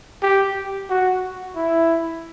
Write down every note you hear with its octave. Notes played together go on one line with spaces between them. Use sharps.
G4
F#4
E4